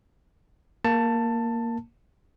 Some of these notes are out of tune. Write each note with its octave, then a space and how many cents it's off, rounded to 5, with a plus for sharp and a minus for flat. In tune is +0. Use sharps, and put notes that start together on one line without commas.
A#3 +0 A5 +15